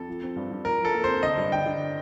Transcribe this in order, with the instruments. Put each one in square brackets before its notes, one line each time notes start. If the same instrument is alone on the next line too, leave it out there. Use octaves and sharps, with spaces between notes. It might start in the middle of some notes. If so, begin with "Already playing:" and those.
Already playing: [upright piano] F2 [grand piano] A4
[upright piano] F3
C4
G2
G2
[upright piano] F3 [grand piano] A#4
[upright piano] F3
[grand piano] A4
[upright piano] A#3
[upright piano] C3 [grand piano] C5
[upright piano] D3 [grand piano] D#5
[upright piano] G2
[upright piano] D3 [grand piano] G5
[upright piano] D3